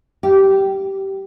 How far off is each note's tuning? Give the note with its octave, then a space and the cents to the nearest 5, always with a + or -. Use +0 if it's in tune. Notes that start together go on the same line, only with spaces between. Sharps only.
G4 -15 F5 -40